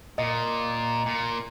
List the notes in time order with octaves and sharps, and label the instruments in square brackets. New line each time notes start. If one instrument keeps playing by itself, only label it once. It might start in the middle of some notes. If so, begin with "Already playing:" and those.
[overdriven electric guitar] A#2 [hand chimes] D#5
[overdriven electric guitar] A#2